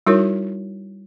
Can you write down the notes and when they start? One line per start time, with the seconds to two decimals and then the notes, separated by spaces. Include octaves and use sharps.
0.07 G3 D#4 E4 F#4 A#4 C#5